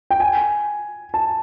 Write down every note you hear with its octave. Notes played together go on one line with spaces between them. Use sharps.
G5
G#5
A5